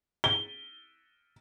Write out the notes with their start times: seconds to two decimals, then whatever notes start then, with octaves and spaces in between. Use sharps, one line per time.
0.24 G7